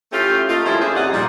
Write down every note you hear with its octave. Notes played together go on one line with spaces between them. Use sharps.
A3 C#4 E4 F4 G4
A3 A#3 D#4 F4
F3 G3 A3 C#4 E4
C#4 F4 G4 G#4 C5
D#2 C3 A#3 D5 D#5 F#5
A#2 F3 G3